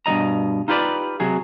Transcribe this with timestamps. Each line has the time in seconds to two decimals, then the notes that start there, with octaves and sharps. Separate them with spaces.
0.06 G2 B2 F3 D#5 A#5
0.68 D#4 F4 G4 B4 D5
1.20 C3 F#3 G#4